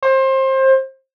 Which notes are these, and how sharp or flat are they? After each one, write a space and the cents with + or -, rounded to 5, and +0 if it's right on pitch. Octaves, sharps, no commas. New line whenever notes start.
C5 +25